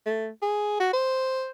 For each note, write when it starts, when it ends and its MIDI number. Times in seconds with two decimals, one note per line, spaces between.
0.06 0.28 57
0.42 0.78 68
0.80 0.90 66
0.93 1.50 72